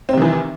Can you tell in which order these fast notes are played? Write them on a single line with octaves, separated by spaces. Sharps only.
C4 C3 D#3 E3